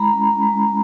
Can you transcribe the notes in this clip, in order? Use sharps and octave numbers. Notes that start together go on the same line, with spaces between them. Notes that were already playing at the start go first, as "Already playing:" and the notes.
Already playing: G#3 E4 A#5 B5
C#4
G#3